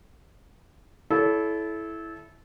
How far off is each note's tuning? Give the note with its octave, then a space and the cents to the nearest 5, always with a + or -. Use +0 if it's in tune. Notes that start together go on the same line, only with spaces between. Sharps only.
E4 +0 A4 -25 C#5 +35